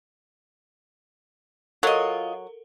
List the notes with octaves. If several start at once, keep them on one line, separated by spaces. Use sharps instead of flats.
F#3 F4 A4 A#4 D#5